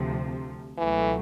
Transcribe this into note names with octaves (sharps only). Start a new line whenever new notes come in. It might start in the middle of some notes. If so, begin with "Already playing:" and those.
Already playing: D2 C3 F3
C#2 B2 E3 F#3 A3